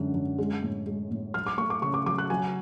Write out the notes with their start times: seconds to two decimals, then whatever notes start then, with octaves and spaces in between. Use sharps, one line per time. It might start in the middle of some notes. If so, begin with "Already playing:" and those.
Already playing: F#2 D3 G#3
0.14 F#2
0.38 G#3
0.62 A2
0.87 G#3
1.11 A2
1.34 F#3 F6
1.47 D6
1.58 A3 C#6
1.70 D6
1.82 C#3 C#6
1.94 D6
2.06 F#3 D6
2.18 F#6
2.30 F#3 G#5